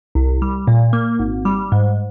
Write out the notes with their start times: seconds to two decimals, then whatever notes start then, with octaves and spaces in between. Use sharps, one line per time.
0.15 C2
0.42 G3
0.67 A#2
0.93 A#3
1.19 G#1
1.45 G3
1.72 G#2